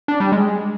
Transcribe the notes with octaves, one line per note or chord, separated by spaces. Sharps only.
D4
G3
G#3